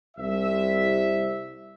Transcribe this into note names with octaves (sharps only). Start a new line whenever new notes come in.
C2 E5